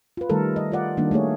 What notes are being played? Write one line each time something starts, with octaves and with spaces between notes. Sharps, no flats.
F4 B4
D#3 G3 A3 A4 A#4
D#5
F4 A#4 D5 F#5
D#3 G3 A#3 D4
A3 A#3 G#4 C#5